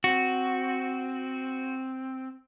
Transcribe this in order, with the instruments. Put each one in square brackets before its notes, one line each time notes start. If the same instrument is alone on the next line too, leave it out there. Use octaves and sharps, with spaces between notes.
[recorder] C4 [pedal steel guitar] F#4